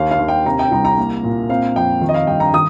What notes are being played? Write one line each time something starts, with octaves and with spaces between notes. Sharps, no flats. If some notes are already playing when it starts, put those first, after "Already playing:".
Already playing: D#2 F5
F5
D#2
G5
C3 A#5
G5
C2 A#5
A#5
A#3
A#2
C4 F5
F2 G5
D#3
D#5
F5
G2 G5
A#5
D#3 D#6